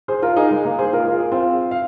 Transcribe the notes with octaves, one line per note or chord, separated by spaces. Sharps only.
G#4 C5
F4 A#4
D#4 G#4
G#3
A#3
G#4 C5
F4 A#4
F4
G#4
C4 F4
F5